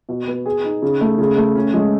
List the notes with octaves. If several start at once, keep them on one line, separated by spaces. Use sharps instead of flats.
B2
B3
G#4
D#4
C#3
A3
C#3
A3
C#4
G#3